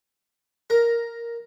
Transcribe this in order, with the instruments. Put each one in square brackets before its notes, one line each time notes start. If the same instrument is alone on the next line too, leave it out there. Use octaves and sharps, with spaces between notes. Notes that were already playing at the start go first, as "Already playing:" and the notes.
[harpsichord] A#4